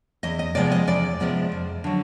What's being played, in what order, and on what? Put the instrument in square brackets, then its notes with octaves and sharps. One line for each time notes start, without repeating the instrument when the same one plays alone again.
[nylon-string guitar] E2 D#5
D#5
C3 F3 G#3 B3 D5
D#5
E2 D5
C3 F3 G#3 B3
F2
D3 F#3